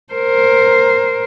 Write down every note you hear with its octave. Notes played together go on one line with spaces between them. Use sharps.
A#4 C5